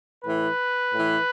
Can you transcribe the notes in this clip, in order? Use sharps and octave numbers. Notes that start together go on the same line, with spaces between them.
A2 E3 B4
A2 E3